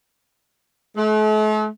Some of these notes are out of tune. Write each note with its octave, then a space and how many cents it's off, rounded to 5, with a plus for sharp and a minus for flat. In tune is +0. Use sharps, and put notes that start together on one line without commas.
A3 -45